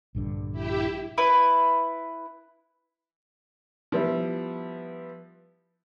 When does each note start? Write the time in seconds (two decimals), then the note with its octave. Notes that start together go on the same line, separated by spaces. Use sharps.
0.15 A#1 G2 D3
0.52 E4 G4 E5
1.18 E4 B4
3.92 F3 G3 B3 E4